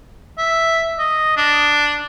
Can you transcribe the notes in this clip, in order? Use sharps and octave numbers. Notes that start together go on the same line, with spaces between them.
E5
D#5
D4